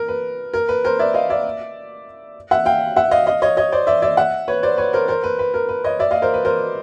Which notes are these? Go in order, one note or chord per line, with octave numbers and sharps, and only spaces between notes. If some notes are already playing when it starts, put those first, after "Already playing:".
Already playing: A#4
B4
A#4
B4
A#4 C5
D5 E5
D#5 F5
D5 E5
E5 F#5
F5 G5
E5 F#5
D#5 F5
D#5 F5
C#5 D#5
C#5 D#5
C5 D5
D5 E5
D5 E5
E5 F#5
B4 C#5
C5 D5
B4 C#5
A#4 C5
A#4 C5
B4
B4
A#4
B4
C#5 D#5
D5 E5
D#5 F5
A#4 C5
B4
A#4 C5